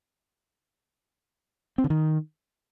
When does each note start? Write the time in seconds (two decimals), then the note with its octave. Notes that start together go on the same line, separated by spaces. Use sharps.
1.78 C4
1.84 D3
1.90 D#3